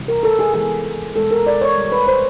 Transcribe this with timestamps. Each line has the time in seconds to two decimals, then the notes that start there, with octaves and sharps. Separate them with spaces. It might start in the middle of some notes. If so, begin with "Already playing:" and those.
Already playing: C3 E3 G3
0.08 A#4
0.23 A4
0.39 G#4
0.54 E3 G#3 B3 G#4
1.16 B2 G#3 B3 A4
1.31 A#4
1.47 D5
1.61 C#5
1.76 D#3 G3 B3
1.92 B4
2.07 C5